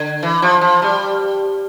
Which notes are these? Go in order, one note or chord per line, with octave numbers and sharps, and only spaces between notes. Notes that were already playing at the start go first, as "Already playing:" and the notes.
Already playing: D3
E3
F3
F3
G3